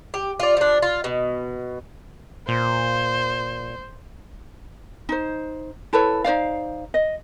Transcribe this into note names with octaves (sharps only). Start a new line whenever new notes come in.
G4
F4 D5
F3 D4
F4
B2
A#2 C5
D#4 C5
E4 A4 B4 C#5
D#4 C5 D5 F5
D#5